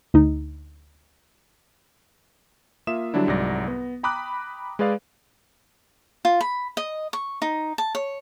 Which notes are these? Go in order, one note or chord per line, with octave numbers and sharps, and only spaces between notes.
D2 D#4
A#3 F4 E5 D#6 E7
D3 F#3 G3 D4 E4
C2 G#2 F#3 D5 A#6
B3
G5 A#5 B5 D6 D#6 F#6
G#3 G#4 B4 D5 F5
F4
B5
D#5
C#6
D#4
A5
C#5